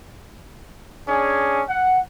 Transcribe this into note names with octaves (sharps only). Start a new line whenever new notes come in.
C#4 D4 G#4
F#5